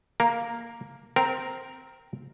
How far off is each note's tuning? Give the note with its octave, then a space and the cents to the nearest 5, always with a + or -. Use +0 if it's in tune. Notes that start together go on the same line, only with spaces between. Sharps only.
A#3 +0 A#4 +0
C4 -10 A#4 +0